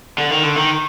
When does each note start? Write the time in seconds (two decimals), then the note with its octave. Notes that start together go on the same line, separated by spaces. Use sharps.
0.18 D3
0.31 D#3
0.43 D3
0.56 D#3